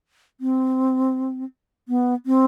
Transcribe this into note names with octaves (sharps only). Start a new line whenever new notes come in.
C4
B3
C4